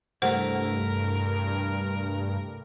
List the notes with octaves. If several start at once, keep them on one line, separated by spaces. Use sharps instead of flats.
C2 G2 A3 A#4 C5 F#5